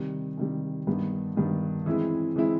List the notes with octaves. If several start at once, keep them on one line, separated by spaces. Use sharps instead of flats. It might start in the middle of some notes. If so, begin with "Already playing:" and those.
Already playing: C3 D#3 G3
C3 D#3 G3
G2 D#3 G3 B3
G2 D#3 G3 B3
E3 G#3 C4 E4
E3 G#3 C4 E4